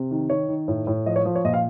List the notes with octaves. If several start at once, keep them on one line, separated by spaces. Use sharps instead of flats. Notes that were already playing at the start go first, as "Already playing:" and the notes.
Already playing: C3
D#3
D#3 C#5
D#3
A2
A2
F3 D#5
C#5
F3
C#5
A#2 D#5
F5